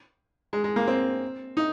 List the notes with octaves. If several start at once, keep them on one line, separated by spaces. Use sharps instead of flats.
G#3
G#3
A#3
C4
D#4